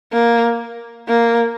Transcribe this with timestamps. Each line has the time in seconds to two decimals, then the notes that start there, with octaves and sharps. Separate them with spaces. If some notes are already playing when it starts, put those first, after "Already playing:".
0.13 A#3
1.08 A#3